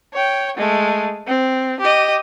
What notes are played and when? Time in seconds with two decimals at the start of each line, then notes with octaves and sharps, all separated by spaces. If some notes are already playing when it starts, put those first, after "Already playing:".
0.14 C#5 G5
0.57 G#3 A3
1.27 C4
1.80 G4 D#5